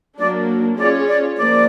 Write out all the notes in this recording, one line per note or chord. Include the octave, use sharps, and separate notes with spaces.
F#3 A#3 D4 D5
C#4 F4 G#4 C#5 D5
D5
F3 A#3 D5